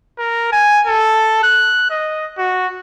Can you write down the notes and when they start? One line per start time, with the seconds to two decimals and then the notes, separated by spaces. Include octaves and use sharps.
0.18 A#4
0.52 G#5
0.87 A4
1.43 F#6
1.90 D#5
2.38 F#4